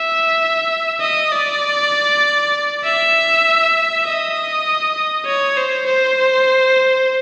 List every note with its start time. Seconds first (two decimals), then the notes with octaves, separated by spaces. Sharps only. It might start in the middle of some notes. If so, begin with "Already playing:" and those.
Already playing: E5
1.01 D#5
1.32 D5
2.84 E5
4.05 D#5
5.26 C#5
5.57 C5
5.87 C5